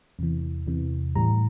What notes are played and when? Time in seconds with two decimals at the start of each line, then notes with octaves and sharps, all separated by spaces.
0.19 E2 C3 E3
0.67 E2 C3 E3
1.15 A2 E3 G3 A#5